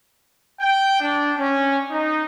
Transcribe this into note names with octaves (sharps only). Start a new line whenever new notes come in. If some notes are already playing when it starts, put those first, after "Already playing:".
G5
D4
C#4
D#4